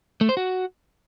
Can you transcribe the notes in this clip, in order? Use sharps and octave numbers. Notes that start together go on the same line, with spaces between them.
A3
C5
F#4